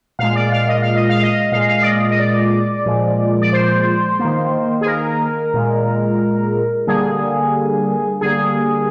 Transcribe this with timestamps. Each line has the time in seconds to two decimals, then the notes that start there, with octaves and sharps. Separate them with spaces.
0.19 A#2 G#3 F5
0.35 D5
0.52 F5
0.68 D#5
0.82 F5
0.96 D#5
1.09 F5
1.23 D#5
1.52 A#2 G#3 F5
1.68 F5
1.82 D5
1.86 D#5
2.11 D#5
2.19 D5
2.86 A#2 F3 G#3
3.42 D5
3.53 C5
4.19 A#3
4.25 D#3
4.81 G#4
4.86 A#4
5.54 A#2 G#3
6.87 D3 G3 A#3 G#4
8.21 D3 G3 A#3 G#4